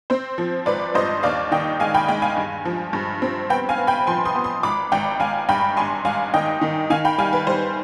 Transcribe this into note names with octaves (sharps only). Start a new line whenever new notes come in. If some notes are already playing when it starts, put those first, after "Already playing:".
C4 C5
F3
G#1 B4 D5
G2 C5 D#5
D#2 D5 F5
D#3 D#5 G5
G#3 F5 G#5
G5 B5
G#3 G5 B5
F5 G#5
G2
F3
G2
C4
B3 G5 B5
F5 G#5
B3
G5 B5
F3 G#5 C6
C6 D#6
B3
C6 D#6
G#1 B5 D6
G#1 G5 B5
G#1 F5 G#5
G2 G5 B5
G#1 G#5 C6
G#1 F5 G#5
D#3 D#5 G5
D#3
D#3 F5 G#5
G5 B5
G3 F5 G#5
B4
G3 C5